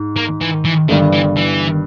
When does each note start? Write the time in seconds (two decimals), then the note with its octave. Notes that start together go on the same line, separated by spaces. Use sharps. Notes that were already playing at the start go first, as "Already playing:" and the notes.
Already playing: G#2
0.16 A#3
0.41 E3
0.65 E3
0.88 G1 G2 D#3 G3
1.13 E3
1.37 E3